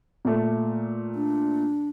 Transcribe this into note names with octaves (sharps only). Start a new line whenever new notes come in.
A#2 A3
D4